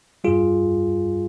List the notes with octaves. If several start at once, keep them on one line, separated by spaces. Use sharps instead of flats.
G2 G3 F4 G#4